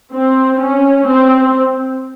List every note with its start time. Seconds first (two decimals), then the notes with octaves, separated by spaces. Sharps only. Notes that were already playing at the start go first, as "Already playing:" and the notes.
0.15 C4
0.61 C#4
1.08 C4